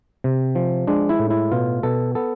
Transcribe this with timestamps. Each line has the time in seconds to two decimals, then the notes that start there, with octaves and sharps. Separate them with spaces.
0.24 C3
0.55 F3
0.87 G#3 D4
1.09 E4
1.19 A2
1.30 E4
1.52 B2 F4
1.83 B2 A4
2.15 B3 A4